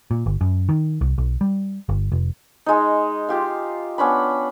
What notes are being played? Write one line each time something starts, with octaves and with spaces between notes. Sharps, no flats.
A#2
G1
F#2
D#3
C2
B1
G3
G1
F1
G#3 D#4
F4 G4 F5
B3 C#4 D4 B5